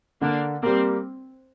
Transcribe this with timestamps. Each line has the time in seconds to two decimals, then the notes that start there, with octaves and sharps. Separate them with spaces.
0.22 D3 A#3 D4
0.63 G3 A#3 C4